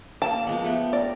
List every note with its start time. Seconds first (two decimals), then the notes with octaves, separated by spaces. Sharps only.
0.22 A#3 A5 D6
0.47 F3 G#3 B3
0.64 A3 B3 G4
0.93 A#4 D5